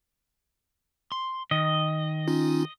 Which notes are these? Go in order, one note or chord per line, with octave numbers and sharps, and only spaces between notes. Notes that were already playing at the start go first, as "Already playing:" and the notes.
C6
D#3 D#5
C#4 D#4 F4